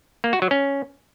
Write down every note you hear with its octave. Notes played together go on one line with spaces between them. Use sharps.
A#3
F#4
F#3
C#4